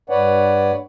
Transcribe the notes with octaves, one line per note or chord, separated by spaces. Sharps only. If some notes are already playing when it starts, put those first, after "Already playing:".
G2 B4 C#5 D5 F#5